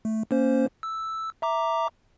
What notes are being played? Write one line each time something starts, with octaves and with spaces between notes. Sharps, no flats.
A3
A#3 C#4 C5
E6
E5 A#5 D6